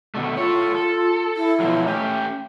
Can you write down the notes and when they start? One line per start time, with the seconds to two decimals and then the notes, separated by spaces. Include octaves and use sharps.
0.15 B2 D3 A3
0.37 F4 A4 C#5
0.75 A4
1.37 E4
1.60 B2 F3 F#3
1.87 A3 C#4 G4